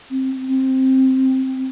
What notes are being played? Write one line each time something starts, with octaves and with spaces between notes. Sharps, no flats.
C4
C4